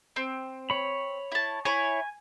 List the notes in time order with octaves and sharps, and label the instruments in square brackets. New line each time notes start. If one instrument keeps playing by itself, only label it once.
[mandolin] C4
[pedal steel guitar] C#5 B5
[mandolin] E4 A5
[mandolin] E4 C#5 [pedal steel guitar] G#5